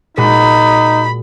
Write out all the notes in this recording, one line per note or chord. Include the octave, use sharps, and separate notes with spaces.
A#2 G#3 D#4 F#4 B5